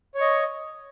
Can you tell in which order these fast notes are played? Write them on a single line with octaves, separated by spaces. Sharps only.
C#5 C#6 D#5